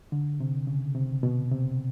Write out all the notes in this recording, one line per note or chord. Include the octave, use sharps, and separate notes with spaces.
D3
C3
C#3
C3
B2
C3